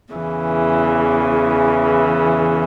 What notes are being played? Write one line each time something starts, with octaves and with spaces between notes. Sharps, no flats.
E2 C#3 E3